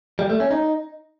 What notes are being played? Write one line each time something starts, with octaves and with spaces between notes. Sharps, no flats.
G3
A3
C#4
D#4